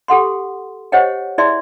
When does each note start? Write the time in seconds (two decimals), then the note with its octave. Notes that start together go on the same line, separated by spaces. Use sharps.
0.08 G4 A4 F#5 C6
0.92 G4 C5 C#5 D#5 F#5 G5
1.38 E4 G#4 D5 E5 C6